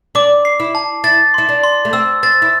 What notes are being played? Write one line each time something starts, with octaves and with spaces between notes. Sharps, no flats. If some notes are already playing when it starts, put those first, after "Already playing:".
D4 D6
C7
E4
A5
E4 A6
E4 C6
D4
C6
A3
C4 E6
C4 A6
E4